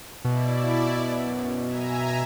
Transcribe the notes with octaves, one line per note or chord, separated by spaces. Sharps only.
B2 E4 D5
F#2
E5 G#5 A#5